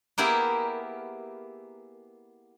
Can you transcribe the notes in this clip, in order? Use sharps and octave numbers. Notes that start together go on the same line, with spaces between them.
A#3 B3 E4 G4 G#4 A#4